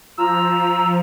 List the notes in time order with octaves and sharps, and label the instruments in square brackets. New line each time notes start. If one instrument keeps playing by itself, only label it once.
[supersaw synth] F3 [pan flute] A#5 [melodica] E6